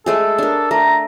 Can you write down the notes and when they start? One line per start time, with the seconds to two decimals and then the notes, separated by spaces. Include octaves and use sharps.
0.06 G#3 A3 G#4 A4
0.38 D4 A#4
0.71 A3 A#5